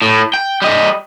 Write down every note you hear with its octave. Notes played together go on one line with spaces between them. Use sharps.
A2
G5
G3 D#5